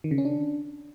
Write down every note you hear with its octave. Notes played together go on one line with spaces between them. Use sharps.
D#3
C#3
C#4
D4